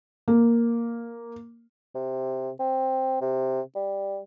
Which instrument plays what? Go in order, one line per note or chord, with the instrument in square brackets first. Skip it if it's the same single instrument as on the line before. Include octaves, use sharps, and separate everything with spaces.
[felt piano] A#3
[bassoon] C3
C4
C3
G3